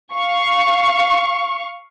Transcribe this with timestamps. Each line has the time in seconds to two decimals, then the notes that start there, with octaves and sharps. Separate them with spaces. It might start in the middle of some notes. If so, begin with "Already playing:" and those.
0.14 F5 C#6